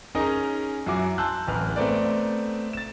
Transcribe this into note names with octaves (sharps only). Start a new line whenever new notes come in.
C#4 D#4 G#4 A#4 D#5
F#2 E4 F#4 G#5 D6
A5 C6 E6 F#6 G6
D1 A1 F6
A3 B3 C4 A#4 D5
A6 E7